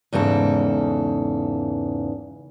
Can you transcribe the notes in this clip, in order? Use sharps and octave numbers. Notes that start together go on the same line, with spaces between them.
E2 G#2 C#3 A4